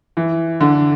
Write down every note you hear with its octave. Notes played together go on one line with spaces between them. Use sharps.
E3
D3